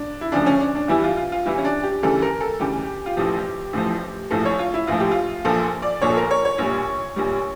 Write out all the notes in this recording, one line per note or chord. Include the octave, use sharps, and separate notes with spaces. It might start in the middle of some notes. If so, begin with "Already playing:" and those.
Already playing: D4
E4
D2 C#3 F3 D4
C#4
D4
D4
E2 E3 G3 E4
F4
F4
F4
E2 E3 G3 E4
C#4
D4
G4
D2 C#3 E3 G3 A4
A#4
A4
D2 C#3 E3 G3 G4
F4
A1 A2 F3 G4
A1 A2 F3
A#1 A2 F3 A4
C#5
F4
E4
A#1 A2 F3 F4
G4
F4
A#1 A#2 F3 A4
D5
A#1 A#2 F3 C#5
A4
A#4
C#5
C#5
A#1 A#2 G3
A#1 A#2 G3